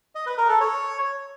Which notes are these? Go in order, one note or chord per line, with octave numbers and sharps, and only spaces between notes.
D#5
B4
A#4
A4
C#5